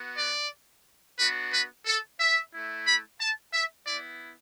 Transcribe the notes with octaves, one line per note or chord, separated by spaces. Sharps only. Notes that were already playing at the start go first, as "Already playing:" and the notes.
Already playing: B3 F#4
D5
B3 D4 F#4 B4
B4
A4
E5
A3 E4
B5
A5
E5
B3 E4 D5